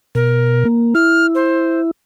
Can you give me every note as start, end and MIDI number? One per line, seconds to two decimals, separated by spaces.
0.15 0.64 47
0.15 0.67 70
0.65 0.94 58
0.95 1.91 64
0.95 1.26 89
1.35 1.81 72